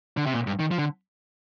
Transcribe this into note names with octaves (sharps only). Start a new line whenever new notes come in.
D3
C3
A#2
G2
D#3
F3
D3